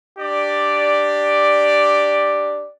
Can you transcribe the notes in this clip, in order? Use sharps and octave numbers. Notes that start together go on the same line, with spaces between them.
D4 G4 D5